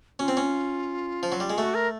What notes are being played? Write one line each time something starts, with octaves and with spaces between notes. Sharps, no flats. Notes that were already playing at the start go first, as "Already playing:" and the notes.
C4 C#4 F4 F#4
C#4
F3
F#3
G3
G#3
A3 F#4
A#4